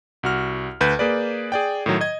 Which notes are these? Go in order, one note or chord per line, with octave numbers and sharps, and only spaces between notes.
C2 F#4 F6
D2 B4 G6
A#3 G#4 B4 D5
G#4 D5 G5
A2 D#3 F#3
D#5 G#6